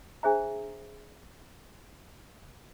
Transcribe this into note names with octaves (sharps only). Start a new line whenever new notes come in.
D4 G#4 C5 E5 A#5